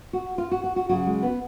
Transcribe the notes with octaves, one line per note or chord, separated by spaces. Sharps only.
F#4
F4
F#4
F#4
F#4
C#3 F#3 F#4
G#3
B3